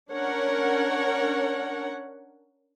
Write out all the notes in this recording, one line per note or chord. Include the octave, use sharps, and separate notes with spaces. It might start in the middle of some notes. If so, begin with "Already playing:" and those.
C#4 D4 A#4 C#5 F#5